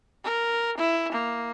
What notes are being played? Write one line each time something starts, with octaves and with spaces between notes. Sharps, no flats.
A#4
E4
A#3